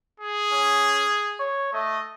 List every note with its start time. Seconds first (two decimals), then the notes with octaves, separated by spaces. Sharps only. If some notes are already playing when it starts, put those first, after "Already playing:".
0.20 G#4
0.52 C#4
1.40 C#5
1.73 A3 D#5